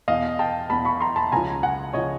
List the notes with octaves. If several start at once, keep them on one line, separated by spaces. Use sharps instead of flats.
E2 B2 D#5 F5
G5 A5
E2 B2 A5 B5
B5 C#6
A#5 C6
A5 B5
C#2 C#3 F3 G#5 A#5
F#5 G#5
C#3 F3 C#5 D#5